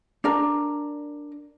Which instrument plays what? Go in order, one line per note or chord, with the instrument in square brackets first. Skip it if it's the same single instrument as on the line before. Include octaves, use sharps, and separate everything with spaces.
[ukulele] D4 A#4 A#5